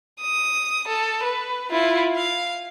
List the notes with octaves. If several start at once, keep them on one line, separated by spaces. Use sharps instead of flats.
D#6
A4
B4
E4 F4
F5